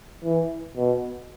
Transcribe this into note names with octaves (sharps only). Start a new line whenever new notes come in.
E3
B2